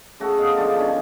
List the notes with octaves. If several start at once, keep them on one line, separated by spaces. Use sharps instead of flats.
C#3 A3 F#4 A4
B3 D#5 F5
F3 G#3 D4 F4
D#3 C#4 D4